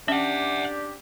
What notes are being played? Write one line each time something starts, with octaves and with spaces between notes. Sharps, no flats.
C#4 D4 G4 E5 F#5